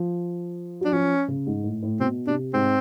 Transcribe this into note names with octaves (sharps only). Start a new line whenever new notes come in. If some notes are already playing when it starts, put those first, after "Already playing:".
Already playing: F3
F#3 D4
F3 C#4
C#3
G#2
A2
A2
B2 C4
C3 D4
G#2 C4